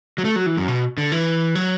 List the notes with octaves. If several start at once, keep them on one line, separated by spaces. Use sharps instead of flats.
F#3
A3
F#3
E3
F#2
B2
D3
E3
F#3